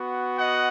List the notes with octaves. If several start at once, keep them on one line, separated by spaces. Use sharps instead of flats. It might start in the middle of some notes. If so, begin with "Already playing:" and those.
Already playing: B3 F#4
D#5 F#5